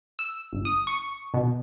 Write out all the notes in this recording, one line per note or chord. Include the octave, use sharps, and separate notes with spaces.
E6
G1
D#6
C#6
B2